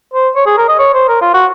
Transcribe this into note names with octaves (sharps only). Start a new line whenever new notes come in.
C5
C#5
G#4
A#4
D#5
C#5
C5
A#4
F4
F#4